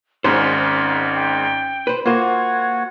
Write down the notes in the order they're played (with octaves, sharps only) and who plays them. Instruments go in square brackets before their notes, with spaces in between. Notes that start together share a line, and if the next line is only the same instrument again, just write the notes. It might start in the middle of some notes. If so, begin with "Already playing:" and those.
[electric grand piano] G#1 G#2 C6 [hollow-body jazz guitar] C#4 C5 [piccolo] F6
[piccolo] G5
[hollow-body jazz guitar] B4 C5
[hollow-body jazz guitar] A#3 C5 [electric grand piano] F4 [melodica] F#4 F#5 [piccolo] G#6